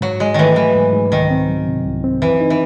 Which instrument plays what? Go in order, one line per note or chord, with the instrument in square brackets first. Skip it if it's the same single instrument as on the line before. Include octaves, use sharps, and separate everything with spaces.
[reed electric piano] G#2 [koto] F#3
[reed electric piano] G#2 [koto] G#3
[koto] D#3 E3 [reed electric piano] A3
[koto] E3 [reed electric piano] F#3
[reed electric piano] G#2
G#2
[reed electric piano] C2 [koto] D#3
[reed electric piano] C4
F#3
C3
C2
C4
[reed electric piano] F#2 [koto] E3
[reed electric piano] D#4
[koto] E3